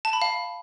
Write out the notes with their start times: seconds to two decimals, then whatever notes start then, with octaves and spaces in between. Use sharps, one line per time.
0.05 A5
0.13 B5
0.22 F5